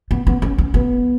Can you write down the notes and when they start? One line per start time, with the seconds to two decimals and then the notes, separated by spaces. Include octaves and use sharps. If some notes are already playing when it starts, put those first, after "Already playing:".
0.11 B3
0.27 B3
0.42 C#4
0.58 C#4
0.74 B3